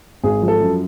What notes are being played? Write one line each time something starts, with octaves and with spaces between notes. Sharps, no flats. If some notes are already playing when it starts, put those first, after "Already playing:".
G#1 G#4
F3
A4
F#2